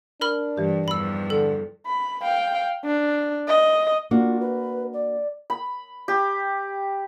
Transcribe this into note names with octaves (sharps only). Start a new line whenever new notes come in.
D4 A#4 B5 F6
G2 E3 G4
E2 G2 F3 B5 E6
D3 A4
B5
F5 G5
D4
D#5
A#3 D4 F4 F#4
B4
D5
B5
G4